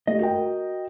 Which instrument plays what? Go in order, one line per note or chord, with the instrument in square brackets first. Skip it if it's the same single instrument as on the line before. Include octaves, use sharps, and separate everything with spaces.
[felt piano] A3 G4 [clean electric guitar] D#5
[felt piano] F#4 A#4 G5